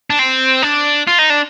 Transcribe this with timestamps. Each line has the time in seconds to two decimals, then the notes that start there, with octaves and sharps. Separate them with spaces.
0.10 D4
0.19 C4
0.62 D4
1.07 F4
1.19 D#4
1.30 D4